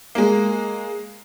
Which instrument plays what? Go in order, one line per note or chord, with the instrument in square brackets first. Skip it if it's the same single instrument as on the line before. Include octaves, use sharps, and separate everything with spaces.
[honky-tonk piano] G#3 A#3